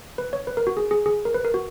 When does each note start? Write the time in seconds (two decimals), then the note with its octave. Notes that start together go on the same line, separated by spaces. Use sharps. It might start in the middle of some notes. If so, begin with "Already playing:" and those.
0.18 B4
0.33 C#5
0.47 B4
0.57 A#4
0.67 F#4
0.77 G#4
0.91 G#4
1.06 G#4
1.25 A#4
1.34 B4
1.44 A#4
1.54 F#4